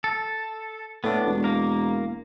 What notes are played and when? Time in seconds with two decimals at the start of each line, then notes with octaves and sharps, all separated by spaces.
0.04 A4
1.04 A2 B3 D4
1.26 E1
1.44 A#3 A#4